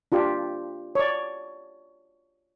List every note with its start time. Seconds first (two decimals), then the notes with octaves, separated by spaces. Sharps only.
0.12 D4 F4 G4
0.95 C#5 D5